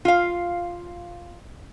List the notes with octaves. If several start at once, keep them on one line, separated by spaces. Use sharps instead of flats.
F4 F5